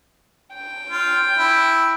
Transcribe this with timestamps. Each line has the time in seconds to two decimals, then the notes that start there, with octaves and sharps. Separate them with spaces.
0.54 G5
0.90 F4
1.37 E4